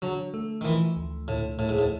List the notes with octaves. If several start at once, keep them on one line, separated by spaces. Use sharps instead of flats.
D3 F#3
A3
D#3
E3 F3
D2
A2 D3
A2 A3
G#2
A2